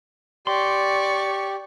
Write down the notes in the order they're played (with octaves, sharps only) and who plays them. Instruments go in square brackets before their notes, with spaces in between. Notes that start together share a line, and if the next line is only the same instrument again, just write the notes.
[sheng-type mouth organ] G4 [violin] D5 C#6 [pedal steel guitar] C6